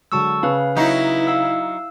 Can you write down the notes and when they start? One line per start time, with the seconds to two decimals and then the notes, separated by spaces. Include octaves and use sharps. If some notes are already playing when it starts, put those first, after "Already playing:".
0.12 D3 F#3 G#3 A5 C#6 E6
0.43 C#3 B4 F5
0.77 F#3 D#4 E4
1.27 F5 E6